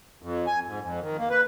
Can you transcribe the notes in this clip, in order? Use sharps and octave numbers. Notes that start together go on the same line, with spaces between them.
F2
G#5
G#2
F2
D#3
A#3
B4